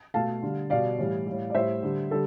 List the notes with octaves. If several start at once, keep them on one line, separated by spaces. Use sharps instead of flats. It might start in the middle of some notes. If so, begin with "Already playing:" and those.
B2 A3 F5 A5
D3 G3
B2 G3 D5 F5
A2 E3 G3
A2 G3
D5
A2 G3 C5 E5
D3 G3
D3 G3 A4